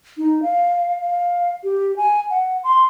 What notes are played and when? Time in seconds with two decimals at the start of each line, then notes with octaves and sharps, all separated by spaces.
0.18 D#4
0.42 F5
1.02 F5
1.64 G4
1.97 G#5
2.30 F#5
2.64 C6